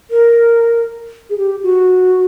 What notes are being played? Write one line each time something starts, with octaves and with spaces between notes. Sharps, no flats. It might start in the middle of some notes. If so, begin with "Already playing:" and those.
A#4
G#4
G4
F#4